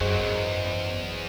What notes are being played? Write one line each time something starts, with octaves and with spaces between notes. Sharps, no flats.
G#1 C#2 F#2 F#3 G#4 C5 D#5
E2